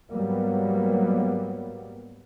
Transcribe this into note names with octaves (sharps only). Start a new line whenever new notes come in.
G#2 F#3 G3 A#3 B3